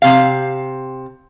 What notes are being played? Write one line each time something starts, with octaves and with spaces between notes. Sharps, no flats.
C3 F5